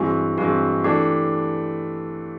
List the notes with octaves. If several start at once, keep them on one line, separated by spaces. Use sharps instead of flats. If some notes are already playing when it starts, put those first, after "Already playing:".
Already playing: G2 E3 G#3 C4 F#4
G2 E3 G#3 C4 F#4
E3 A3 D4 G4